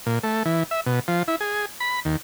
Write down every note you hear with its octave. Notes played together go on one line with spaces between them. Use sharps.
A#2
A3
E3
E5
B2
F3
E4
G#4
B5
D#2